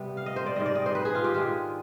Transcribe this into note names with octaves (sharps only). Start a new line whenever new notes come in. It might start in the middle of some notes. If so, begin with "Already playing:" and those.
Already playing: C3 G3 B3
F5
D#5
C5
D5
G#2 D#3 G3 D#5
D5
D#5
C5
B4
G#4
F4
G4
D#3 G#3 D4 F4 G#4